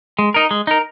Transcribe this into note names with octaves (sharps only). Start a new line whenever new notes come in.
G#3
D#4 A#4
G#3
D#4 A#4